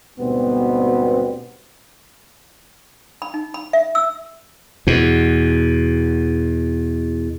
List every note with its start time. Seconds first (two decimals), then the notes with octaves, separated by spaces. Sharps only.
0.18 D2 G#2 B2 G3 B3 C4
3.22 B5
3.34 D#4
3.54 B5
3.73 E5
3.95 E6
4.87 E2 B2